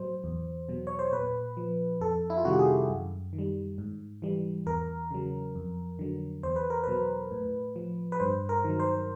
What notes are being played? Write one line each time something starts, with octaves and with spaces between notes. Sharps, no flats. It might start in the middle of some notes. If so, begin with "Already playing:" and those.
Already playing: A2 F#3 C5
E2
B2 F#3
C#5
C5
A#2 B4
F3
F2 A4
E4
F4
C3 D#3 G3 F#4
G4
G#4
F#2
D#3
G3
G#2
E3 G3
E2 A#4
C#3 F#3
F2
D3 F#3
E2 C5
B4
A#4
B2 F#3 B4
A2
F3
B4
G2 C5
A#4
D#3 F#3
C5